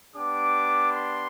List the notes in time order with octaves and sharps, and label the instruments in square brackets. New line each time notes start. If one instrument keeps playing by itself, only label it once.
[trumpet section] B3 D4 G4 D6
C6